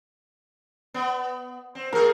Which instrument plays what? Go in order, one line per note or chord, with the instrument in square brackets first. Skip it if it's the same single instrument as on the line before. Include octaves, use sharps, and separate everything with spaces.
[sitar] B3
C4
[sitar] B2 A3 G#4 [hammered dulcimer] A#4